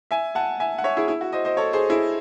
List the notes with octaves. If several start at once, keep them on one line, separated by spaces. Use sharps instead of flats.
E5 G#5
F#5 A5
E5 G#5
F#5
C#5 E5
E4 G#4
E4
F#4
C5 D#5
C5 D#5
A4 C#5
G#4 C5
E4 G#4